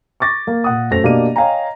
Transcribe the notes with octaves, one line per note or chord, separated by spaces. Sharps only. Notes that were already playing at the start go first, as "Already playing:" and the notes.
C#6 D6 A6 A#6
A#3 A#4
A#2 F#5 D#6
F#2 A3 C5 A#6 F7
B2 A#3 D4 G4 D#5 D#7
C#5 D#5 F5 G5 G#5 A#5